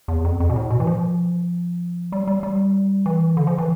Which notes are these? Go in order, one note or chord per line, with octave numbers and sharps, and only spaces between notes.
E2
F2
F2
B2
A2
B2
E3
F3
G3
G3
G3
E3
D3
F3
E3